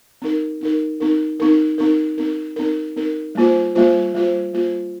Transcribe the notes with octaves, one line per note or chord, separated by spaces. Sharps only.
C4 D#4 A#4
C4 D#4 A#4
C4 D#4 A#4
C4 D#4 A#4
C4 D#4 A#4
C4 D#4 A#4
C4 D#4 A#4
C4 D#4 A#4
G3 A#3 F4 C5
G3 A#3 F4 C5
G3 A#3 F4 C5
G3 A#3 F4 C5